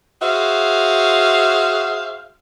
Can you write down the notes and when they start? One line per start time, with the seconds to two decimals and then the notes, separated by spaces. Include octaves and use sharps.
0.22 F#4 G#4 C5 E5 F5